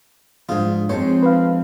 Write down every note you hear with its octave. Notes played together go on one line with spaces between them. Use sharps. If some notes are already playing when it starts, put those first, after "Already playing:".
G#2 F3 G#3 D4 F4
F3 G#3 C4 D#4 A4 C5 C#5
B4 F5